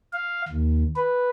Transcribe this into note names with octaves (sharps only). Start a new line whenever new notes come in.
F5
D#2
B4